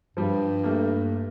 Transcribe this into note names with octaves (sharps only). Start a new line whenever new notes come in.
G2 F3 G3
G3 A3 A#3